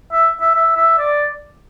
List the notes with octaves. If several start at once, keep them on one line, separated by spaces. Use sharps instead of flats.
E5
E5
E5
E5
D5